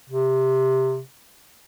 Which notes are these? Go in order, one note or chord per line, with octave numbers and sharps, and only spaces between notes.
C3